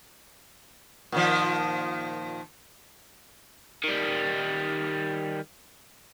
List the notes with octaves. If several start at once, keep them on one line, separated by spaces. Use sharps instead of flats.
A#2 D#3 F3
D#3 G3